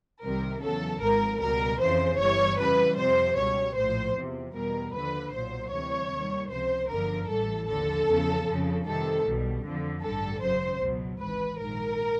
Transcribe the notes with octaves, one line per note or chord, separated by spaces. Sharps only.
C2 C3 D#3 G3 A#4
E2 C#3 F#3 A4
G#1 G#2 F3 A#4
C#2 B2 G3 A#4
F2 C#3 E3 C5
G1 G2 E3 G3 C#5
F2 C#3 E3 G3 B4
F2 C3 F3 C5
C#2 B2 G3 C#5
A#1 A2 F3 C5
E2 C3 F3
E2 B2 G3 A#4
D#2 D3 F3 B4
B1 A#2 F#3 C5
D2 C3 E3 G3 C#5
D#2 D#3 G3
C#2 C3 F3 C5
G1 F#2 D3 F3 A#4
A1 A2 E3 G3 A4
D#2 D3 F3 A4
E2 C#3 F3
F2 C#3 F3
F2 C3 D#3 G3 A4
B1 B2 G3
F2 D3 F3
A1 G2 D3 G3 A4
G#1 F#2 C#3 F#3 C5
C#2 B2 F#3
G#1 G#2 E3 B4
A#1 G#2 D#3 A#4